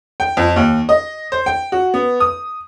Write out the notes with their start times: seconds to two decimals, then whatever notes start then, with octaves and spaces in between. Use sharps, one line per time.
0.20 G5
0.37 F2
0.56 D#2
0.89 D#5
1.32 C5
1.46 G5
1.72 F#4
1.94 B3
2.20 D#6